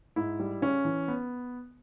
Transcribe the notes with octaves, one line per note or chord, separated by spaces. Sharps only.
G#2 E4
G3
C#3 C#4
E3
B3